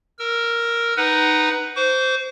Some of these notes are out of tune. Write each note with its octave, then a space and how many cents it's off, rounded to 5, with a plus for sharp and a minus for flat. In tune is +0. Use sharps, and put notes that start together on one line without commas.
A#4 +0 E6 +30
D#4 +0 B4 +0 F#5 +25
C5 -10 C#6 +45